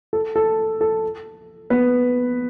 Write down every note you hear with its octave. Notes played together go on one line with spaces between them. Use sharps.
A4
A4
A4
B3 B4